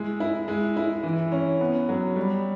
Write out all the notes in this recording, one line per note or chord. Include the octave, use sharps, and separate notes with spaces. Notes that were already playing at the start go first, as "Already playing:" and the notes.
Already playing: G#3 E4
E4
G#3
E4
E3
C#4
B3
F#3
G3